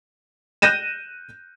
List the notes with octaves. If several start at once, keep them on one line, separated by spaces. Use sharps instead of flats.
F#6 G6 A#6 D#7 E7